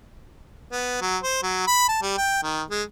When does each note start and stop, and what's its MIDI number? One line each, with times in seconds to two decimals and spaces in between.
0.72 0.96 59
1.01 1.17 54
1.23 1.40 72
1.43 1.64 54
1.67 1.88 83
1.89 1.99 81
2.02 2.16 55
2.18 2.42 79
2.43 2.62 51
2.70 2.83 56